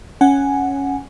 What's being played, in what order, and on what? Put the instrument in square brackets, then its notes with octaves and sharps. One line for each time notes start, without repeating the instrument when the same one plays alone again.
[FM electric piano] C#4 F#5 G#5